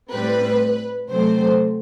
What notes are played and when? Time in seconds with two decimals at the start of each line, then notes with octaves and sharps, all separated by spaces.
0.11 A2 G3 C4 B4
1.09 C3 F#3 A3 C4 C5